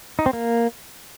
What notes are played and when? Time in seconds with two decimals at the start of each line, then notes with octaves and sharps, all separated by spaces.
0.19 D#4
0.26 C4
0.33 A#3